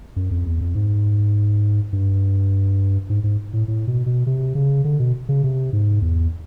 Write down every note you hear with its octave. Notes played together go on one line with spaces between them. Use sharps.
F#2
F2
E2
F2
G#2
G2
G#2
G#2
A2
A2
B2
B2
C3
C#3
D3
B2
C#3
C3
G#2
E2